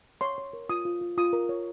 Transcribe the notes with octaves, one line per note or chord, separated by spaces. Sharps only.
C#5 C6
C#5
A#4
F4 D#6
F4
F4
F4 D#6
A#4
C#5